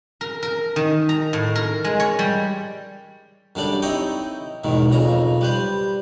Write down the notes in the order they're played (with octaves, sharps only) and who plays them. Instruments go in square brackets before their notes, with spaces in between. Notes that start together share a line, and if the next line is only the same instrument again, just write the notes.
[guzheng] A#4
A#4
D#3
A#5
A2
A#4
G#3
C#5
G3
[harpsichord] F#2 D3 G3 D4 D5
C4 D#4 E4 C#5 D#5 G5
E2 G#2 B2 D#3
B1 F2 C#3 A#5
G3 B4 C5